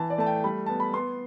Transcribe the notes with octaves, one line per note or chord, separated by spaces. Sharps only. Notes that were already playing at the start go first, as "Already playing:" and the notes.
Already playing: E3 A5
D5
A3 A5
G5
G3 B5
B3 A5
B5
B3 C6